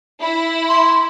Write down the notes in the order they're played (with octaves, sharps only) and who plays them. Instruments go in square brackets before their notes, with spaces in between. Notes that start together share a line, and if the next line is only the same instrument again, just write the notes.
[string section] E4
[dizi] C6